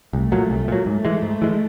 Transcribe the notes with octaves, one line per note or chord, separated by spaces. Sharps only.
C2 A3
A#2 F#3
C2
A#2 F#3
G#2 A3
E3 G#3
G#2
E3 G#3